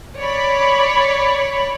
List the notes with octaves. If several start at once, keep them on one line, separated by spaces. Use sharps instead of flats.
C#5 D5 B5